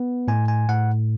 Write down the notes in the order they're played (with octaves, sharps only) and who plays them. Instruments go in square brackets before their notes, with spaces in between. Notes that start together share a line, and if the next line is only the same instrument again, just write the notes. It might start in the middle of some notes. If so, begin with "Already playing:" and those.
Already playing: [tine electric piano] B3
A2 G#5
G#5
A2 F#5